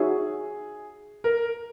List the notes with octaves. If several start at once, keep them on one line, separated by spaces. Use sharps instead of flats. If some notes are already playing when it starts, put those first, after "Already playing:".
Already playing: D#4 F#4 G#4 C#5 E5
A#4